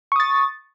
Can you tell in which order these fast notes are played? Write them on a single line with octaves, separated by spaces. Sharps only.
C#6 D#6 A6